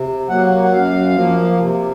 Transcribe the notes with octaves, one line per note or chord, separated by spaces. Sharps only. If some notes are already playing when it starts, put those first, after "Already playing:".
Already playing: C3
F#3 A#3 F#5
F#5
F#2 F5
F3 A#3
C3